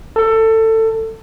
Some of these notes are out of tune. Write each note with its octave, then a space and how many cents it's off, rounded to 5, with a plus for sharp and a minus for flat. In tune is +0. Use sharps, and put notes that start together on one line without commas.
A4 +20